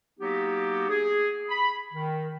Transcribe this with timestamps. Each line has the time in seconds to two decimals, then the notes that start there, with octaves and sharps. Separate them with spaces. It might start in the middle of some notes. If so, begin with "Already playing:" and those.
0.20 F#3 A#3 B3 D#4 F#4 G4
0.89 G#4
1.49 B5
1.93 D#3